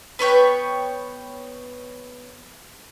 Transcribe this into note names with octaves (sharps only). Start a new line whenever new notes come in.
B3 B4 C#5 G5